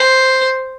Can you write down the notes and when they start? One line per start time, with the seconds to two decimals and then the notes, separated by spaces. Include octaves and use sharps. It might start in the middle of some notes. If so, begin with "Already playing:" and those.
Already playing: C5